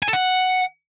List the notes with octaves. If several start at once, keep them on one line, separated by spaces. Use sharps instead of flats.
G#5
A4
F#5